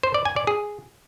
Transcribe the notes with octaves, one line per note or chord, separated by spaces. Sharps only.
C5
D5
G#5
D5
G#4